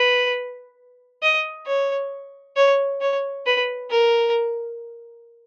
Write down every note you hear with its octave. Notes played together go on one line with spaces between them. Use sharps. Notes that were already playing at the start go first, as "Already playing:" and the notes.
Already playing: B4
D#5
C#5
C#5
C#5
B4
A#4